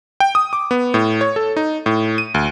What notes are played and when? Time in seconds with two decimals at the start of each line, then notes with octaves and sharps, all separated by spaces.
0.20 G5
0.35 D#6
0.53 D6
0.71 B3
0.94 A2
1.21 C#5
1.36 A4
1.57 D#4
1.86 A2
2.18 D#7
2.34 D2